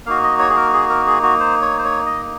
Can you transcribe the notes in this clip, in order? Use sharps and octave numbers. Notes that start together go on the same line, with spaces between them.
A#3 D#4 F#4 F5
D#5
C#5
G#4
A#4
G#4
A#4
G#4
F#4
C5
C#5
C5
C#5
D#5